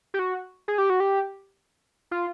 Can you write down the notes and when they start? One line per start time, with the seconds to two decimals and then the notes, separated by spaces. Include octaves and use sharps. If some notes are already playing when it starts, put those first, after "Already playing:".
0.14 G4
0.19 F#4
0.68 G#4
0.78 G4
0.90 F#4
1.00 G4
2.11 F4